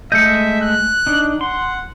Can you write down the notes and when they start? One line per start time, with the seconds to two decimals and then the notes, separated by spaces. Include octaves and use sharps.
0.12 G#3 A3 D#5 E5 G6 C#7
0.61 F#6
1.07 D4 D#4
1.41 F#5 C6